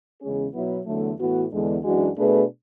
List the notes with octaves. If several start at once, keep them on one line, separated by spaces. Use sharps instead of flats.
E2 C#3 G#3 C#4 G#4
B2 F#3 B3 E4
E2 D3 F#3 A3
A2 E3 B3 F#4
E2 D3 G#3
F#2 E3 G#3 D4 F#4
B2 A3 D4 G#4 B4